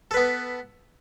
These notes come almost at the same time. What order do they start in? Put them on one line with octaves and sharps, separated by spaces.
A4 B4 B3